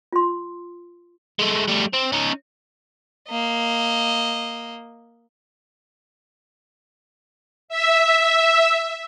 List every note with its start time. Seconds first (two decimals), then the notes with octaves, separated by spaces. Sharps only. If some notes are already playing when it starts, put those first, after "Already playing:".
0.13 F4 C6
1.39 G#3 A3
1.67 G3 A3
1.93 C4
2.12 C#4 D#4
3.29 A#3 D#5
7.69 E5